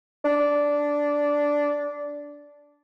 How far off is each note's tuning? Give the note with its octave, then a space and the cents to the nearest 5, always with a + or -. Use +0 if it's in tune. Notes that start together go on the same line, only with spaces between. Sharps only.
D4 -10